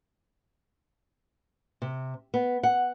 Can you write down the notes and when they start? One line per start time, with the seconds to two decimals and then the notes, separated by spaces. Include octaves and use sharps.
1.82 C3
2.34 B3
2.63 F#5